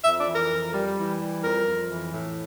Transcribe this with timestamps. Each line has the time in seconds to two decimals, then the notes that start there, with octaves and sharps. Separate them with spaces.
0.04 F2 E5
0.20 D5
0.27 E3
0.34 A#4
0.50 F2
0.73 G3
0.97 E3
1.19 G3
1.42 F2 A#4
1.65 F2
1.88 E3
2.10 A2